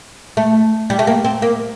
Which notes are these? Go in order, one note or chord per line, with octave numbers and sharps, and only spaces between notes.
A3
G3
A3
A#3
C4
A#3